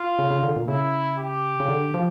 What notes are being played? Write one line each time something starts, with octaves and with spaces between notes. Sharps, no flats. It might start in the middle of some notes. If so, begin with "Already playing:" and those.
Already playing: F4
C#3
C#3
D3
A#2
C#3 E4
G4
C#3
D3
F3